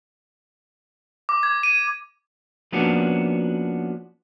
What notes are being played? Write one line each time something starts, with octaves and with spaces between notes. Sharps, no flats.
D6
G#6
D#7
F3 A#3 B3 C#4 D4 F#4